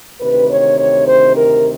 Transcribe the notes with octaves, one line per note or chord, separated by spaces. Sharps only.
D2 C3 D#3 B4
C#5
C#5
C5
A#4